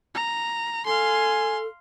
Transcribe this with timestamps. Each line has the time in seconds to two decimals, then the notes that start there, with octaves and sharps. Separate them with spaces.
0.15 A#5
0.86 A4 F5 G#5 C6